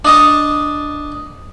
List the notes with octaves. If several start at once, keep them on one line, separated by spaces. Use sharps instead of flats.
D4 D#5 A5